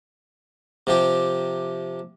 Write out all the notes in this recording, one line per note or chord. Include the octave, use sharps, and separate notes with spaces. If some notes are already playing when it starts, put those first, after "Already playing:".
C3 F3 G4